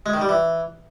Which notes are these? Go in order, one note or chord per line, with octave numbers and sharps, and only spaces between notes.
G#3
D#3
G3
E3